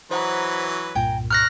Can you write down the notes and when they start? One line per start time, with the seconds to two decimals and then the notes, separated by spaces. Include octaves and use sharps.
0.11 E3 F#3 B4 C5 D#5 F#5 A#5
0.95 C2 G2 A#2 G5 G#5 A#5
1.31 A#4 C#5 F6 F#6 A#6